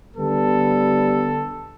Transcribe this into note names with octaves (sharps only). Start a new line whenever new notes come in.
D3 G3 B3 A4